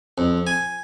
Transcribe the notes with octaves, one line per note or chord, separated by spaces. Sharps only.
F2
G#5